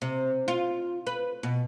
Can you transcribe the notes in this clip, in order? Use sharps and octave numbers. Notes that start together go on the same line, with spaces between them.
C3
F4
B4
B2